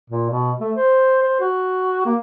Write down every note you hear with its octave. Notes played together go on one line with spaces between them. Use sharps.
A#2
B2
A3
C5
C5
F#4
A#3